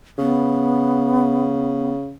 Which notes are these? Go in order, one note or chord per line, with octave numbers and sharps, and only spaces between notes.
C#3 B3